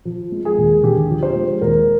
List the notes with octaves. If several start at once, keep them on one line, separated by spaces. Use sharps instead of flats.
F3
G#3
G#4
D#2
D3 G4
F3
C5
G#3
D#2 A#4